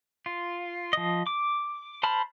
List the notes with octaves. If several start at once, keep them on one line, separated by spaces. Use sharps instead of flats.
F4
F3 D#5
D6
C5 A5 B5 F6